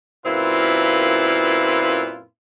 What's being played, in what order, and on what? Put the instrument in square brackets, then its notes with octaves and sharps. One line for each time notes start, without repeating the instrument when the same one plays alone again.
[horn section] F#2 A#2 C4 E4 F4 B4